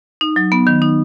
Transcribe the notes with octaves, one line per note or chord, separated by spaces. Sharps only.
D#4
F#3
B3
D#3
D#4